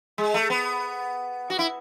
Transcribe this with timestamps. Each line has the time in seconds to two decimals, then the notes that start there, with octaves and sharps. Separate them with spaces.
0.18 G#3
0.34 A3
0.50 B3
1.50 F#4
1.59 E4